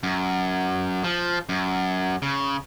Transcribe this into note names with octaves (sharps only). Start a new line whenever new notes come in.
F#2
F3
F#2
C#3